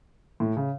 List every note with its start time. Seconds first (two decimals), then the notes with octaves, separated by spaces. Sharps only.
0.40 A2
0.57 C#3